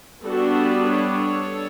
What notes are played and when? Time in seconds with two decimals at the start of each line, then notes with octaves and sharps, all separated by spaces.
0.24 G3 B3 D4 F#4 A4
0.90 A4 C#5